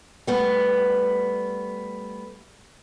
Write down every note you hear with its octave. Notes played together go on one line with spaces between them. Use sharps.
G3 A3 B3